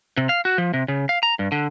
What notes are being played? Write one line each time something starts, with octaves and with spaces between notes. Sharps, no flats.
C3
F5
F#4
F3
C3
C#3
F5
A#5
G2
D3